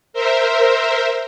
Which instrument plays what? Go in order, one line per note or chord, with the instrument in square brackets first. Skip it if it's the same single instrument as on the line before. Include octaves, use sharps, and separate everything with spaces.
[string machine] A#4 C5 E5